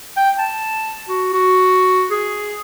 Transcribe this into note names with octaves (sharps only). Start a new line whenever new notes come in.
G5
A5
F#4
F#4
G#4